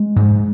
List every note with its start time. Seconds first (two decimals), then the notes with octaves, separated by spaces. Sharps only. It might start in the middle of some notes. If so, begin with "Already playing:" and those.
Already playing: G#3
0.16 G#2